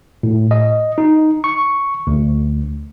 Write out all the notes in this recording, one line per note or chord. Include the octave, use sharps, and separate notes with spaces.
A2
D#5
D#4
C#6
D2